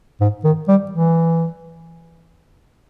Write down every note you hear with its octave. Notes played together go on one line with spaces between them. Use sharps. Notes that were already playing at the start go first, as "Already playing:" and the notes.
G#2
D#3
G3
E3